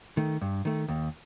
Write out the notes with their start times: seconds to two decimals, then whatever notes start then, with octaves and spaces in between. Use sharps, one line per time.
0.17 D#3 A3
0.41 G2
0.65 D#3 A3
0.88 D#2